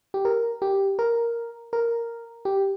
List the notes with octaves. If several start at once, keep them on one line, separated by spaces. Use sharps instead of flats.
G4
A#4
G4
A#4
A#4
G4